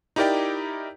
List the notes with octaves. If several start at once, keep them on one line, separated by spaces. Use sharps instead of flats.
D#4 E4 G4 A#4 D5 G5